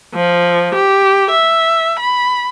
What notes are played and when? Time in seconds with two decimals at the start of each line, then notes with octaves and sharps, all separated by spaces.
0.15 F3
0.75 G4
1.31 E5
1.99 B5